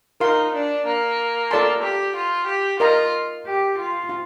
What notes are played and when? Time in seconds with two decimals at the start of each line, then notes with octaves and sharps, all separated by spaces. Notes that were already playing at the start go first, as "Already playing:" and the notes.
0.20 D#4 F4 A#4 F5 C6
0.54 D4
0.86 A#3
1.51 F4 A4 D5 A5 C6
1.83 G4
2.15 F4
2.47 G4
2.80 F4 A#4 D#5 A#5
3.45 G4
3.77 F4
4.09 F4